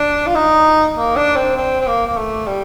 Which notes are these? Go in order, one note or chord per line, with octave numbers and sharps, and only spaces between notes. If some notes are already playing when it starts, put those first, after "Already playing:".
Already playing: D4
F4
D#4
A#3
D4
C4
C4
C4
A#3
A#3
A3
G3